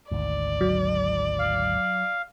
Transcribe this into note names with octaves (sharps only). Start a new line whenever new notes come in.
G#1 D2 G#2 D5
F#3
F5